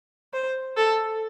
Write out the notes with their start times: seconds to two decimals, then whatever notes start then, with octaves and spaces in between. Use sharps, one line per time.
0.34 C5
0.77 A4